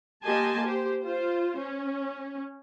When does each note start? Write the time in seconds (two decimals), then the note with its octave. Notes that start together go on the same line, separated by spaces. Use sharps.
0.24 A#3 G4 D#5 G#5 A5 C6
0.64 G4 C5
1.03 F4 C5
1.58 C#4